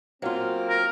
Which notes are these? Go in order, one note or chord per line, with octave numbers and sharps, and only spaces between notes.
F#3 A#3 C4 F4
A#4